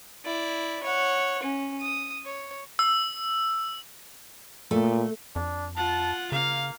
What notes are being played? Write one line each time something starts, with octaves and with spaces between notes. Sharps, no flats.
E4 D5
C#5 F#5
C#4
D#6
C#5
E6
A#2 A3
F2 D4
F4 F#5 A5
C#3 A#3 F5